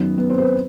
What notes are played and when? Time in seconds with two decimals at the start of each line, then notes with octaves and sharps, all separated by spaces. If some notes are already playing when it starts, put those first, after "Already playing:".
Already playing: F#2 D#3 F#3 B3
0.18 B3
0.30 C4
0.38 C5
0.42 B4